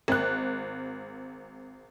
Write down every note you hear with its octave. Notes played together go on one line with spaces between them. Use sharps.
G#1 F#6